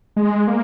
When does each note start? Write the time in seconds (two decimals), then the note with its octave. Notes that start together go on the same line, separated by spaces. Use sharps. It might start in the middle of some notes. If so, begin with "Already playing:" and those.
0.16 G#3
0.47 A#3